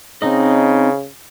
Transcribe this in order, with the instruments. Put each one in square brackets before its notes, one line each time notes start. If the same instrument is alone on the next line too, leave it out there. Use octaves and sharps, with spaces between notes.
[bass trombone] C#3 [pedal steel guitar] C4 D#4 D#5